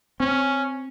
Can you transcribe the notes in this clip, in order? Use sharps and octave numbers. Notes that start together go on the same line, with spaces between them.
C4 C#4